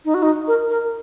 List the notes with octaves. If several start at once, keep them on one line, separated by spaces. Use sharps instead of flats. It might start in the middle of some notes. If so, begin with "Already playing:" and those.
D#4
F#4
D#4
A#4
A#4